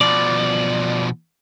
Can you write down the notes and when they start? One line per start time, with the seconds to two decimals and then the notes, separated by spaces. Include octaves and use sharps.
0.01 B2 F3 D5